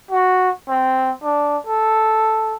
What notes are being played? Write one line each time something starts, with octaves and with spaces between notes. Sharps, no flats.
F#4
C4
D4
A4